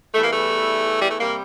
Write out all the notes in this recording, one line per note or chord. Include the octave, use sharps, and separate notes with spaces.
E2 E3 G3 A3
A#3
A3
G3
A3
C3 G3 A#3